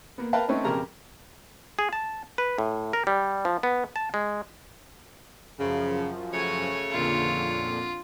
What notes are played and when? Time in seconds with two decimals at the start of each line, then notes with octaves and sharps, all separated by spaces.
0.18 A#3 B3
0.33 A#4 B4 F5 G5 A5
0.48 A3 C4 C#4 D#4 B4
0.64 B1 F2 C#3 G4 A#4 A#5
1.79 G#4
1.93 A5
2.38 B4
2.58 A2
2.93 A#4
3.07 G3
3.45 F3
3.63 B3
3.96 A5
4.14 G#3
5.58 F#2 C#3 F3
6.33 C#3 A3 F#4 C#5 G#5
6.91 F2 A#2 D3 F4